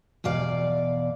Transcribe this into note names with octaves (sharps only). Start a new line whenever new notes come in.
E2 B2 D5 F5